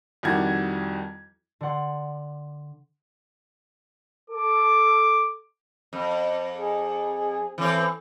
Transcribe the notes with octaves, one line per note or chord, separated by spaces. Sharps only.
F2 D#3 G3 E4 F#4 G#6
D3 D5 F#5 C6
A4 D6
F2
G#4
E3 C4 A4 C#5